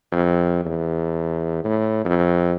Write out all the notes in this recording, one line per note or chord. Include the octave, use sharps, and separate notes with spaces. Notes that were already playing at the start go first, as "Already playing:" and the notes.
F2
E2
A2
F2